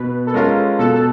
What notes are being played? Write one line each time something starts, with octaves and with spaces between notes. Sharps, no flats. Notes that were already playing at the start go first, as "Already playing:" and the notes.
Already playing: B2 B4
A4
G#3 C#4 F4 A#4
B2 A4
A4